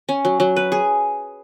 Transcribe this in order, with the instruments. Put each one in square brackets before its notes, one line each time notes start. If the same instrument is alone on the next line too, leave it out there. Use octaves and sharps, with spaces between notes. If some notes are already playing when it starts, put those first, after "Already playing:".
[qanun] C#4
F#3
F#3
B4
G#4